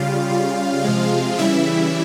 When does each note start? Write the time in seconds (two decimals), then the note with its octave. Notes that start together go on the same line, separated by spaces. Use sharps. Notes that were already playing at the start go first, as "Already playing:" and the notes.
Already playing: C#3 G3 F4 F5
0.30 C#3 G3
0.84 C3 F3 G#3
1.38 C#3 E3 G3 E4 E5